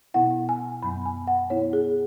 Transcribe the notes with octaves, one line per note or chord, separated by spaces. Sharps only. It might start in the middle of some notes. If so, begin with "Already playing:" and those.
B2 B3 E4 F#5
G#5
F#2 F#3 B3 B5
G#5
F#5
B2 B3 E4 C#5
G#4